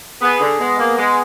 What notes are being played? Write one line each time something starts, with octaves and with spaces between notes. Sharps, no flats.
B3 G#4
D3
G#3 B3
A#3
G#3 G#4